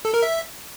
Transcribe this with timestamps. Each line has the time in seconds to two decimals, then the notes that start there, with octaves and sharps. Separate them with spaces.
0.05 A4
0.14 A#4
0.22 E5